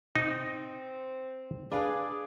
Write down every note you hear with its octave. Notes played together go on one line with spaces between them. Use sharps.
C4 D#4
D4 G#4 B4 D5 F5